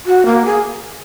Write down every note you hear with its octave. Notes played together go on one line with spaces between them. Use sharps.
F#4
A#3
G#4